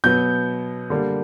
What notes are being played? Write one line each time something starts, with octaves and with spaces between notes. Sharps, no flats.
B2 F#3 B3 G6
D3 G3 A#3